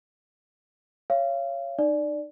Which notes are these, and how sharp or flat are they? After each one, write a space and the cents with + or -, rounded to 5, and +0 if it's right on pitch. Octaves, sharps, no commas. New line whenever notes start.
C#5 +0 F5 -30
D#4 -35 D5 +0